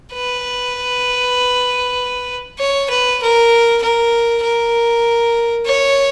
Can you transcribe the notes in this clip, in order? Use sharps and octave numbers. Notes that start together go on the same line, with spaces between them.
B4
C#5
B4
A#4
A#4
A#4
C#5